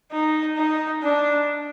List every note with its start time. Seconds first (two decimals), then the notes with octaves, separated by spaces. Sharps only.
0.12 D#4
0.56 D#4
1.03 D4